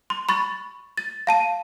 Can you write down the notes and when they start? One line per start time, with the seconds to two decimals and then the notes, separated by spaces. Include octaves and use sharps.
0.10 C6
0.29 B5 C#6 A6
0.97 A6
1.27 F5 A5 D#7